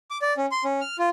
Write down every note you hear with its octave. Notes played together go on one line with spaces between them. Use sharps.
D6
D5
C#4
C6
C#4
F6
F4